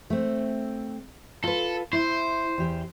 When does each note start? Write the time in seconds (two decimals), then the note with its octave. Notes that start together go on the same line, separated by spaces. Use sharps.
0.10 A3 C4
1.44 F4 A4 B4
1.93 E4 C5
2.58 E2 G4